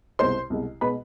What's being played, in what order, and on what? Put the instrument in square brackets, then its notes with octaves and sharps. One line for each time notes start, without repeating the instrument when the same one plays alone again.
[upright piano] C2 B2 G#3 C5 C6
C2 B2 G#3
B2 G#3 B4 B5